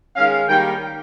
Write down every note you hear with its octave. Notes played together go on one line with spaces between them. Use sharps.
D#3 G#3 C#4 F5
D#3 G3 A#3 G5